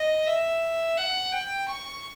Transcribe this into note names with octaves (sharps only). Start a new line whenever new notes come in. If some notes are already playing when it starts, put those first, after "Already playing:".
Already playing: D#5
E5
F#5
G5
C#6